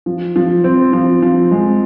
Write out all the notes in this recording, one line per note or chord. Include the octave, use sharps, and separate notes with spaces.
F3
F3
C4
F3
F3
G#3